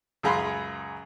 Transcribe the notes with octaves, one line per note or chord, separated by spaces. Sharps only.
C#2 F#2 G#4 F5 B5 C6